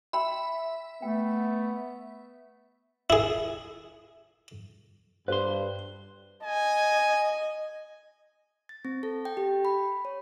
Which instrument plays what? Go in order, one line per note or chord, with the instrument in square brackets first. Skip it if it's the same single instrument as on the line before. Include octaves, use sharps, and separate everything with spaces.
[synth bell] E5 [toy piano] G5 B5 C6
[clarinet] A3 [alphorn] B3 [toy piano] G5
[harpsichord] E4 G#4
[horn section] G2 [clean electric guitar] B4 C6 [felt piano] C5
[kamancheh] D#5 [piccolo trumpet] G#5
[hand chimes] A6
C4
A4
G5
G4
B5
C#5